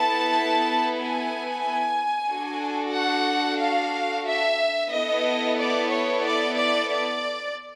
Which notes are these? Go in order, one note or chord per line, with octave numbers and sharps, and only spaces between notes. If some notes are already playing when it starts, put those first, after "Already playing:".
Already playing: B3 E4 A4 A5
G#5
D4 F#4 A4
F#5
F5
E5
B3 E4 A4 D#5
D5
C#5
D5
D5
D5